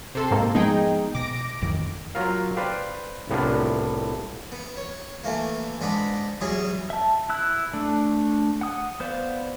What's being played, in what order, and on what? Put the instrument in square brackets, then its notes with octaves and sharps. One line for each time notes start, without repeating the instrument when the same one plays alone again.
[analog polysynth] C3 A4 C6
[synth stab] G#2 A#3
[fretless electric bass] F3 G#3 B3 [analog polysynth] D#4 G#4 G5
[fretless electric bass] B2 [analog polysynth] D6 A#6 D7
[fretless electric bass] A1 F2 D#3
[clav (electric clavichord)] F#3 F4 A#4 F5
B4 C5 D5 F5 G5
C2 A2 B3 D4 F4
[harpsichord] B3
C#5
E3 A3 A#3
G#2 B3 D4 B5 D6
E2 F#3 G3 G#4 D#6
[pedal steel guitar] E5 A5
E4 E6 F#6
A3 D4
F#5 D#6
B3 C5 D5 F5